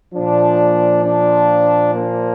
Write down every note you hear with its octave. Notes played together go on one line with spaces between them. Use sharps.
A#2 F3 D4
D4
A#3